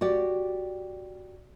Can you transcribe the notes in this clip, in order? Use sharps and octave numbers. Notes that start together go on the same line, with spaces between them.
F#4 G4 D5